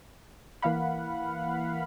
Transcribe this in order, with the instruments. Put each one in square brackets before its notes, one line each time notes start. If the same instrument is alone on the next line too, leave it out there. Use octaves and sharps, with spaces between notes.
[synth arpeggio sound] E3 A#3 F5 F#5 B5